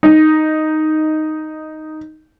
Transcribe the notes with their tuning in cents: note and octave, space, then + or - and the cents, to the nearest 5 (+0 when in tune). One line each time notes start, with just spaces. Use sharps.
D#4 +0